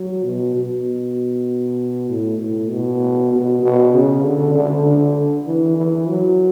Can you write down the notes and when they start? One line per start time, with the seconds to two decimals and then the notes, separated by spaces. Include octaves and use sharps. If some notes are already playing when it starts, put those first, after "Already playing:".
Already playing: F#3
0.24 B2
0.55 B2
2.09 A2
2.40 A2
2.70 B2
3.32 B2
3.63 B2
3.94 C#3
4.24 D3
4.55 D3
4.86 D3
5.47 E3
5.78 E3
6.09 F#3